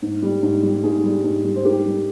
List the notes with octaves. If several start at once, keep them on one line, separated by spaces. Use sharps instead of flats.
G#2
G3
G#2
G3
G#2 G#4
G3
G#2
G3
C5
G#2 G4 A#4
G3